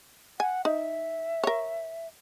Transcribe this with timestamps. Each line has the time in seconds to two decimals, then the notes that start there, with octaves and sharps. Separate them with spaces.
0.40 F#5 G#5
0.65 D#4 E5
1.44 A#4 C#5